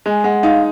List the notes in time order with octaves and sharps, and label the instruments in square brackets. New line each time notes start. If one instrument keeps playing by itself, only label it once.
[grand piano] G#3 [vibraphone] G#5
[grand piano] G#3 [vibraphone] F#5
[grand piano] D#4 [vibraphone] F5